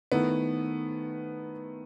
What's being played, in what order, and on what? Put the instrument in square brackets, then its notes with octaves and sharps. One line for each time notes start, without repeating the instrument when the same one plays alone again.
[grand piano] D#3 A3 E4 [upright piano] B3